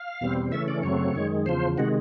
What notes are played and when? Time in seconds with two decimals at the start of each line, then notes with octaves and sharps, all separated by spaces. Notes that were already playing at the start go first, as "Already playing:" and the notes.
Already playing: F5
0.21 E2 B2 G3 C4
0.52 C#3 E3 A3 C#4 E5
0.68 D5
0.83 F#2 C#3 F#3 A3 C4 C#5
1.15 F#2 D#3 G#3
1.46 E2 C#3 F3 C5
1.78 C3 D#3 G#3 F#4